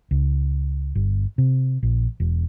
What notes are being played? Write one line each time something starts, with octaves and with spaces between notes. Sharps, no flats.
C#2
G1
C3
A#1
E1